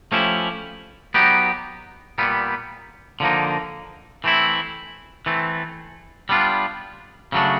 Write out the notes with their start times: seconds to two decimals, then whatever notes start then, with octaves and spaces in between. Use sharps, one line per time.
0.12 F3 A3 C#4 E4 G4
1.14 F#3 B3 D#4 G4
2.18 A#2 G3 B3
3.20 D3 F3 A#3 D#4
4.24 E3 A3 C4 E4
5.26 E3 A3 C4
6.29 G3 B3 D4 F4
7.32 C#3 F#3 A3 D4